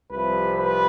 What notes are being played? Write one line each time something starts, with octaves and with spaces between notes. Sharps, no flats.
C2 C3 F3 B4
B4